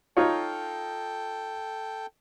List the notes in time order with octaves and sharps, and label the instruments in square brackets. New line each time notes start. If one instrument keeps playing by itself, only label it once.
[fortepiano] D#4 F4 C#5 [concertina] A4 G5